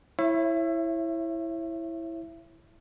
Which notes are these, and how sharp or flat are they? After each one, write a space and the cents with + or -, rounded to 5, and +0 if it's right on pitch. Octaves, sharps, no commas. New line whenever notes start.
E4 +0 C#5 -25 E5 +25